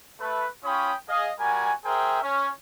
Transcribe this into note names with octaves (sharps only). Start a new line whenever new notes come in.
A3 B4
C#4 F4 C#5 G5 B5 D#6
G#4 D#5 F5
G3 F#4 A#4 G#5
G#4 A#4 C5 E5 G5
C#4